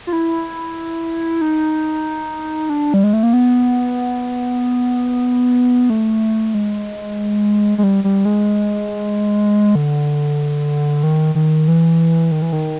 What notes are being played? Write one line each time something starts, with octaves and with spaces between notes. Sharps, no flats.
F4
E4
D#4
D4
G3
G#3
A3
A#3
B3
A3
G#3
G#3
G3
G3
G#3
D3
D#3
D#3
E3
D#3
E3
D#3